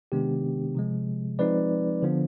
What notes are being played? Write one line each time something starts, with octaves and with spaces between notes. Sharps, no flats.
C3 D#3 G#3 B3 D4 G4
C3 F3 G#3
F3 G#3 C4 D#4 B4 D5
D3 F3 B3 D4